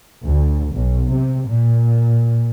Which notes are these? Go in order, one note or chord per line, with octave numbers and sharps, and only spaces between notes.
D2
B1
C3
A#2